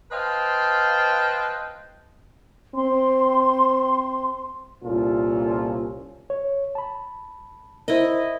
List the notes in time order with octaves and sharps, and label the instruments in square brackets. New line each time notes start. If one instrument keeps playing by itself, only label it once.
[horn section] B4 C5 D#5 F5 G5 A5
[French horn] C4 [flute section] C6
[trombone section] C2 A#2 C#4 F4 A4
[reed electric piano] C#5
A5 B5
[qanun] E4 D#5 [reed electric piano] A#4 C5